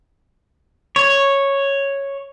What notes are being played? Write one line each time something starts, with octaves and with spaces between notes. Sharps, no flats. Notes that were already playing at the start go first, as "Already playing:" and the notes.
C#5